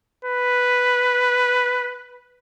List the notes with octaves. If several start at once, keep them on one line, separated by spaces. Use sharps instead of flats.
B4